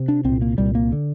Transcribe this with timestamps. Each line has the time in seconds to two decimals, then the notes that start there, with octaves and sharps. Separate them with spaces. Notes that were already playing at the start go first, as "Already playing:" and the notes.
Already playing: C3
0.08 D4
0.24 C2 A#2 C4
0.42 A#3
0.58 C2 A#2 G3
0.75 A#3
0.92 D3